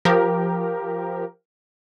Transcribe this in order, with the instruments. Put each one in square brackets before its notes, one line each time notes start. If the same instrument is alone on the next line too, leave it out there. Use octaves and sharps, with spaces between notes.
[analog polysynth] F3 G4 A#4